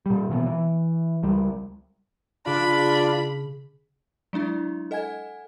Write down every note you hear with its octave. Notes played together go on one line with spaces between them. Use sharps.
A#2 G3
B2 E3 G3 B3
E3
C#2 G3
C#3 D4 F4 B5
F#3 G#3 D4 E4
A4 D#5 F#5 G#5 G#6